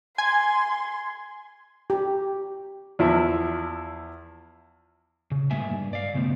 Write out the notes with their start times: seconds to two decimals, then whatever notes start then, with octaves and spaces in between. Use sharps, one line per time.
0.18 G#5 C6 G#6
1.90 G4
2.99 E2 F3 E4 E5
5.31 C#3
5.51 G#2 G3 A#3 E5 G#5
5.69 G2
5.93 D5 F5
6.14 C#3 A3 B3 C4